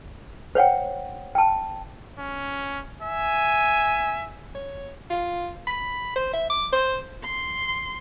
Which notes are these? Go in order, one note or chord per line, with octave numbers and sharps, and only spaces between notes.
C5 C#5 F#5 G5
G5 A5
C#4
E5 G#5
C#5
F4
B5
C5
E5
D6
C5
C6